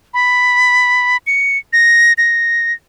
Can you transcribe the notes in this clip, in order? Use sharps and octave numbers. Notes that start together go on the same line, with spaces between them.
B5
C#7
A#6
A#6